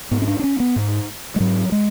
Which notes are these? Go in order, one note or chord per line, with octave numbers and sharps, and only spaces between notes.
G#2 B3
C#4
D4
D4
C#4
B3
G#2
G#3
G#2 F#3
G#3